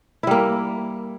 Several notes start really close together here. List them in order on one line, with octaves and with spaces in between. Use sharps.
E4 G3 A#3